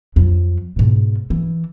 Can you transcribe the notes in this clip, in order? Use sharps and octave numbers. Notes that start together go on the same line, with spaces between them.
F2 F#3
G#2 B2
E3